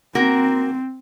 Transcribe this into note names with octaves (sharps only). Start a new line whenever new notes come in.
A#3 C4 F#4 A#4